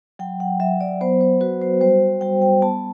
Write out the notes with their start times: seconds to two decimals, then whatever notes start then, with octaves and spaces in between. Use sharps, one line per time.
0.19 F#3 G5
0.40 F#5
0.60 F#3 E5
0.81 D5
1.01 B3 C5
1.21 C5
1.41 F#4 B4
1.62 C5
1.81 G3 C5
2.21 G3 G5
2.42 G5
2.62 B3 A5